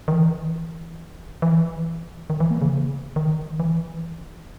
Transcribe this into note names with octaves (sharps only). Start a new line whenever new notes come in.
D#3
E3
E3
D#3
E3
A#3
C#3
D#3
E3